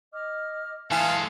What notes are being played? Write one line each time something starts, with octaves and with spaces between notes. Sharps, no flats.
D#5 D6 F6
E3 G#3 A4 B4 F5 A5